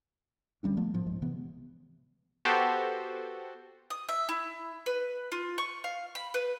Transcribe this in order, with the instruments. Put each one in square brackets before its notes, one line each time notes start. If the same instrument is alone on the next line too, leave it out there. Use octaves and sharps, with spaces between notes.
[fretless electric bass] D2 G3 C#4 D4
F3 A3 B3
A2 F3
C2 G#2 F3 G#3
C3 E3 B3
[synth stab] B3 F#4 G4 A4 C5
[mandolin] D#6
E5
E4
B4
F4
C#6
F5
B5
B4